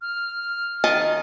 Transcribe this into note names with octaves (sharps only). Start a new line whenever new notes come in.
F6
D#3 D#5 A5